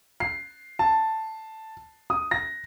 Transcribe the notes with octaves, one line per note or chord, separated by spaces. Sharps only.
C7
A5
D#6
A#6